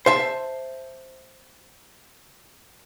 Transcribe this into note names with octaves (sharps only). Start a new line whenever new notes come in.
C5 E5 A5